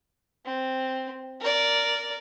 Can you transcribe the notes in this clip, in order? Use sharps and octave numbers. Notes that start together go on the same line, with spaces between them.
C4
A#4 D5